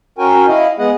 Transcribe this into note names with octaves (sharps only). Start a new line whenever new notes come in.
C#4 F#4 A#4 G5 G#5
E4 D#5 F5
G#3 B3 G#4 D#5 F#5